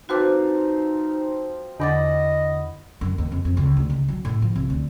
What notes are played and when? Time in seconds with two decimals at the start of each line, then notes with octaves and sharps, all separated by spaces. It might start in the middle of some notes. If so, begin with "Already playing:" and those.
0.09 F3 C4 D#4 F4 F#4 B4 D6
1.80 E2 D3 D#5 F#5 B5 D6 A6
3.01 F#2
3.18 D#2
3.32 F2
3.45 F2
3.57 C#2
3.77 D2
3.90 C#2
4.08 F#3
4.25 A2
4.42 F3
4.56 C2
4.70 D2